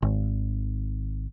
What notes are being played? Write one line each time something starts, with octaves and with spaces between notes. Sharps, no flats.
G#1